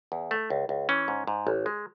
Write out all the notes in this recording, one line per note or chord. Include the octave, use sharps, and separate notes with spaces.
E2
A3
C#2
C#2
E3 C#4
G#2
G#2
A1
G#3